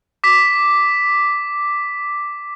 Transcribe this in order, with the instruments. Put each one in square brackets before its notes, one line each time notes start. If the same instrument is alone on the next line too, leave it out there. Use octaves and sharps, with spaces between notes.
[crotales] D6 B6